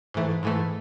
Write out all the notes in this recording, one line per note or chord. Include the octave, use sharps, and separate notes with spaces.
G#2 E3 A3
G#2 E3 A3